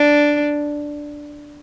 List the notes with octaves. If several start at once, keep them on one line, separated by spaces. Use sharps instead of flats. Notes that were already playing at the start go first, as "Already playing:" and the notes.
Already playing: D4